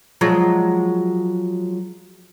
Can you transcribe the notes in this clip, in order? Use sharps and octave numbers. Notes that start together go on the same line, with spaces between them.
F3 F#3 G#3